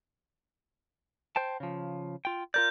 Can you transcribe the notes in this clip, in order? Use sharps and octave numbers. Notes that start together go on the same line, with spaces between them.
C5 G5 A5
C#3 F3
F4 G5
F4 A#4 D5 G6